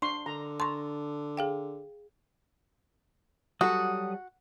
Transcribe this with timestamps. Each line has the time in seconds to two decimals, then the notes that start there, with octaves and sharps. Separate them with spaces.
0.02 D4 C6 C#6
0.26 D3 A#5
0.60 A5 A#5 C6 C#6
1.37 G#4 F5 G5
3.61 F#3 G3 F#4 A4 D#6